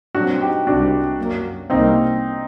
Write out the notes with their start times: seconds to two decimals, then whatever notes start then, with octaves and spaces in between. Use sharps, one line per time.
0.15 A#2 F#3 C4 D4 F#4
0.40 D#4 G4
0.67 C2 C3 G3 C4 D4 F#4
1.18 F#2 F#3 A#3
1.70 C2 C3 G3 A#3 C4 D#4